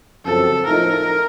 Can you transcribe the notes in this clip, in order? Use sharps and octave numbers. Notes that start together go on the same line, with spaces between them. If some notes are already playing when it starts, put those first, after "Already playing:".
F#2 C#3 F3 C4 A4
A2 F3 A3 D#4 A#4